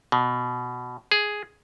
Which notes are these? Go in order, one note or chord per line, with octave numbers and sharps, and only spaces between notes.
B2
G#4